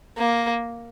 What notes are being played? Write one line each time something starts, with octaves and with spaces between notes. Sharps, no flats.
A#3